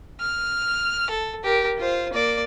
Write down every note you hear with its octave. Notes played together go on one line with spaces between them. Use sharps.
F6
A4
G4 A#4
F4 C5
A#3 D5